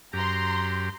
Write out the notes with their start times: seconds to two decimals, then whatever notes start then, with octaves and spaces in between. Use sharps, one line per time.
0.13 F#2 G4 A#5 C6